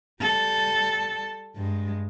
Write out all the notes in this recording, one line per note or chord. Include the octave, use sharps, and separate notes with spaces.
G3 A4
G2 G#3